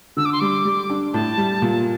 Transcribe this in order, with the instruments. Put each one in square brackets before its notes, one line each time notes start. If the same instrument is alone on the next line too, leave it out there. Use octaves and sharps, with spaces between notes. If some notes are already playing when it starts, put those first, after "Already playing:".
[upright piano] D3 [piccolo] E6
[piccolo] D6
C6
[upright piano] G3 [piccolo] D6
[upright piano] G3
D4
[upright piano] A2 [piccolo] A5
[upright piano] G3
A#2